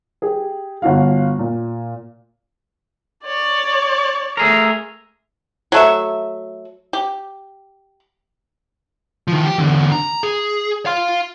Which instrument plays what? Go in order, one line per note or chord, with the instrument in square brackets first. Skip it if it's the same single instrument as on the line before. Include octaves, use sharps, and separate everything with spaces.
[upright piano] G4 G#4
G1 F#4 F5
A#2
[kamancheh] C#5 D5
[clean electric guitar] A3 G#4 A#4
[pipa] F#3 A3 E5
G4
[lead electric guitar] D#3 F3
G4
E2 D3
A#5
G#4
F5 C6